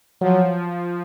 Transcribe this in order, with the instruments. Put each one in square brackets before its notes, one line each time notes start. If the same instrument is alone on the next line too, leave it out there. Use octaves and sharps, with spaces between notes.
[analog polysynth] F3 [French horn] F#3